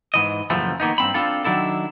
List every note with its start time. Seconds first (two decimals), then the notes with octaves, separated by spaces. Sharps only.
0.14 G#2 E3 D#5
0.50 F#2 A#2 C#3 E3 F3 A3
0.80 D#3 A#3 B3 D#4
0.98 G2 C4 B5
1.14 C4 D4 F4 A4
1.44 D#3 F#3 D4 E4 A4